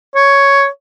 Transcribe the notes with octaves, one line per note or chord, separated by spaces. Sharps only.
C#5